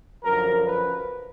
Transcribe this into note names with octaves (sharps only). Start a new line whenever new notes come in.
F#2 D3 F3 A#4
B4